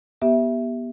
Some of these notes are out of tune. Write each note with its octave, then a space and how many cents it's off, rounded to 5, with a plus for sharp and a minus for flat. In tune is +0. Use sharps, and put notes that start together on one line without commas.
B3 -25 G4 +0 E5 +0